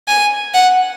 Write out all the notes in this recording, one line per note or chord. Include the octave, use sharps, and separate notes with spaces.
G#5
F#5